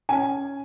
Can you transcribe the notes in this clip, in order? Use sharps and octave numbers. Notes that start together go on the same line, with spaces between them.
C#4 G#5